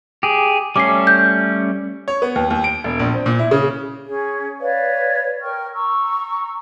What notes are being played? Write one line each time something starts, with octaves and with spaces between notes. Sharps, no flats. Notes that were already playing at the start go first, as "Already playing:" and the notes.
G4 G#4
G3 A3 C#4 D6 C7
G6
C#5
B3
D#2
D#2
D7
E1
A#1
C4
A#2
E4
C#3
C#4 G#4
B4 C#5 D5 F5
A#4 G5 C#6 F6
A#5 C#6 E6